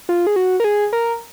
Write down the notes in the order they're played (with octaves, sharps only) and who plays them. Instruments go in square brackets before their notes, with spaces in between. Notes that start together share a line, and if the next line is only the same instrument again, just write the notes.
[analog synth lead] F4
G#4
F#4
A#4
G#4
A#4